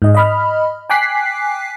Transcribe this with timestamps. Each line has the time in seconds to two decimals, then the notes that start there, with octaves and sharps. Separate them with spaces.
0.02 G#2 D#5
0.15 D#5 B5 F6
0.90 G5 G#5 D6 F#6 B6 C7